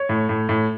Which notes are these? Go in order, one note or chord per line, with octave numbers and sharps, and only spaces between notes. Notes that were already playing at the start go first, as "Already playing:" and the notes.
Already playing: C#5
A2
A2
A2